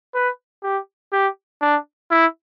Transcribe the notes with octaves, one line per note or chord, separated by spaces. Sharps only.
B4
G4
G4
D4
E4